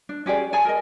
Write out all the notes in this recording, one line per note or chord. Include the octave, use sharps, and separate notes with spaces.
D4
C#4 G4 G#4 D5
G#4 D5 G#5 A5
A#4 D#5